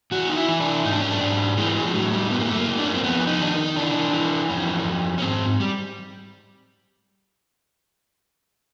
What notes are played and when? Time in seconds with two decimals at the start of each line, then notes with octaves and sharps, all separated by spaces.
0.12 E3 F#4
0.29 D#4
0.36 E4
0.48 E3
0.60 D4
0.84 G#2 D#4
0.92 D4
1.00 C#4
1.08 D4
1.20 G#2
1.57 E3 G#3
1.75 G#3
1.85 F3
1.94 A2 F#3
2.12 G3
2.30 F#2 B3
2.40 A#3
2.49 A3
2.58 A#3
2.67 F#2
2.78 D4
2.87 C#4
2.95 C4
3.03 F2 B3
3.27 D#4
3.39 D#3 D4
3.53 D#4
3.76 E3 D4
4.13 E3
4.49 F2 C#4
4.85 F2
5.18 C#4
5.22 G#2 C4
5.60 G3